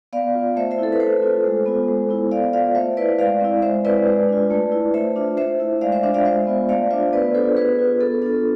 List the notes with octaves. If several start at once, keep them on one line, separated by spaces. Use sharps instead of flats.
B3 D5 F5
F4
A3 C5 E5
C5 E5
C4 E4 A4
B4
A3 A4 C5
C4 F4
G#3
B3 F4
G#3
B3 E4
B3 D5 F5
F4 D5 F5
A3 C5 E5
E4 B4 D5
G#3 D5 F5
C4 E4
G#3 C5 E5
C4 E4 B4 D5
G#3
D4 F4
A3
E4
A3 C5 E5
D4 F4
A3 C5 E5
E4
G#3 D5 F5
C5 E5
D4 F4 C5 E5
D5 F5
G#3 C5 E5
B3 F4
A3 D5 F5
D4 F4 C5 E5
B3 B4 D5
D4 F4 A4 C5
B3 G#4 B4
F4
B3 A4
D4 F4 A4